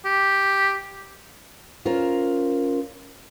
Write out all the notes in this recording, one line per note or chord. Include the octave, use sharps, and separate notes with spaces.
G4
C#4 F4 A#4 C5